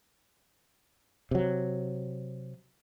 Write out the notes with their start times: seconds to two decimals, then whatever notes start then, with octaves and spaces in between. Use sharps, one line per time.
1.31 C3 F#3